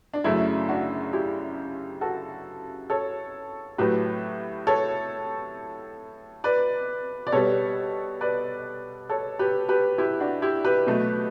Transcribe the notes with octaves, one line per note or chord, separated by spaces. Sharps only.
D4
F#2 C#3 F#3 A3 E4
D4 F#4
E4 G4
F#4 A4
A4 C#5
A2 F#3 A3 G4 B4
A4 C#5
B4 D5
D5
B2 G3 A4 C#5
B4 D5
A4 C#5
G4 B4
G4 B4
E4 G4
D4 F#4
E4 G4
G4 B4
B2 F#3 A3